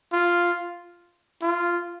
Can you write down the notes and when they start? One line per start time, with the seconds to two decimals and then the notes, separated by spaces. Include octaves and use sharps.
0.12 F4
1.42 F4